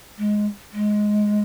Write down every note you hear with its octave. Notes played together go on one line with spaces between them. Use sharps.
G#3
G#3